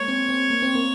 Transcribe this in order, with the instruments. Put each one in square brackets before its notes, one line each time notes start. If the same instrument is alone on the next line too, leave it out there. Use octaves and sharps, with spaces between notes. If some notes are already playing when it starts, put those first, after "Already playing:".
Already playing: [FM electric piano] G#3 A#3 [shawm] C#5
[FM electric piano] C4
C4
A#3
C4
A#3